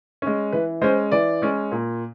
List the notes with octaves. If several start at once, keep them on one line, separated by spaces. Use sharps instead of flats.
G#3 C#4
E3 B4
G#3 C#4 C5
E3 D5
G#3 C#4
A#2